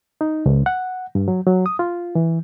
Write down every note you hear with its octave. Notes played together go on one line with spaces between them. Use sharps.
D#4
C#2
F#5
G2
F#3
F#3
D#6
F4
E3